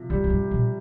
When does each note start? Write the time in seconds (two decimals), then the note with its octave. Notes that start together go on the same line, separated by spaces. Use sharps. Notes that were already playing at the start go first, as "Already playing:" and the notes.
Already playing: C3 F3
0.10 F2 G3
0.24 F2
0.30 G2
0.51 A#2